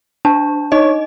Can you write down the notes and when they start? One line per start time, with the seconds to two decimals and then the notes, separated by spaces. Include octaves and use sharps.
0.25 D4 A5
0.72 D#4 C#5 D#5